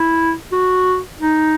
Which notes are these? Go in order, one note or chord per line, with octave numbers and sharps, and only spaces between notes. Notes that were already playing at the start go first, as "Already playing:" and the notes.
Already playing: E4
F#4
D#4